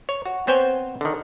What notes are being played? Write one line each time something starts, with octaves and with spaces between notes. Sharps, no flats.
C#5
F#4
B3 C4 C5 C#5 G5 G#5
D3 D#3